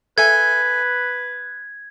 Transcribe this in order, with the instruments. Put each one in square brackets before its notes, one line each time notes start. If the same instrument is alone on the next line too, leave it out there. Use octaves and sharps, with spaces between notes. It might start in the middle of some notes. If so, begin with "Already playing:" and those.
[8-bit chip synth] A4 E5 G#5 [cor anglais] B4 [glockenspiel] G#6